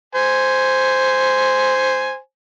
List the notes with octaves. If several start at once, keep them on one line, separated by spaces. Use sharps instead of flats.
C5 G#5